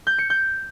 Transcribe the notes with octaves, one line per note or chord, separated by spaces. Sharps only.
G6
C#7
G6